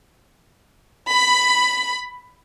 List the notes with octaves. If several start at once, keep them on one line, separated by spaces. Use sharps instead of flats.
B5